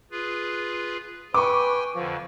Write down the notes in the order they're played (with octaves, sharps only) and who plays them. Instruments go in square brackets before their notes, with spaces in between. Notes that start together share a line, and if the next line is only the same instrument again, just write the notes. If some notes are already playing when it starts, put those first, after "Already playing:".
[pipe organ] F4 G#4 B4
[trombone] B4 [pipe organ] G5 G#5 [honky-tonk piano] C#6 D6
[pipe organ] F2 D3 [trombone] F3